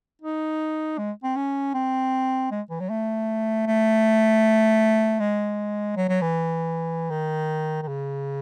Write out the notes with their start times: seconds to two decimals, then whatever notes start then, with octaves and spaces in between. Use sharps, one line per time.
0.22 D#4
0.98 G#3
1.23 C4
1.36 C#4
1.74 C4
2.51 G#3
2.70 E3
2.80 F#3
2.90 A3
3.67 A3
5.19 G#3
5.96 F#3
6.09 F#3
6.21 E3
7.10 D#3
7.82 D#3
7.88 C#3